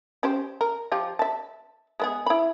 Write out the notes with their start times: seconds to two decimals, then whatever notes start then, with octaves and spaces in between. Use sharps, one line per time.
0.23 C#4 G4 C5
0.61 A#4
0.92 F3 F4 G4
1.19 E5 A5
2.00 G#3 B3 G#4
2.26 E4 B5